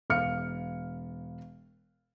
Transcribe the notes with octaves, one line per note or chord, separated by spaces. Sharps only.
E1 F5 F6 C#7